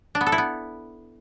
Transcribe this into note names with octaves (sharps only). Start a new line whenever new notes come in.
D4
B3
A4
E4
B3